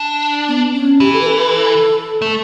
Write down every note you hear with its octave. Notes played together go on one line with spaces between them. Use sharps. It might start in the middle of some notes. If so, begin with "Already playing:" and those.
Already playing: D4
B3
C#4
E3 G4
A4
B4
A4
B4
A4
A3